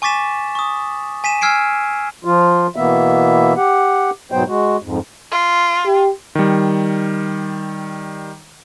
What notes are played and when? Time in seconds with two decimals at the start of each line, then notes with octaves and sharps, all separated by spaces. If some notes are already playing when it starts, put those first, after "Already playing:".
0.02 G#5 C#6 D6 A6 B6 E7
0.55 C#6 D#6
1.24 G#5 B6 D#7 E7
1.41 G#5 E6 F6 G#6 C7 D7
2.25 F3 F4
2.76 B2 E3 A#3 B3 E5
3.56 G4 F#5
4.32 G#2 B2 F#3 B3 C5 G5
4.48 G#3 F#4
4.83 F2 G#2
5.31 F4
5.86 G4
6.35 D#3 G3